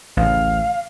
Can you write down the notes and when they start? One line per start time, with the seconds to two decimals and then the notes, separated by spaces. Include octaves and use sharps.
0.17 A1 D2 C#3 F5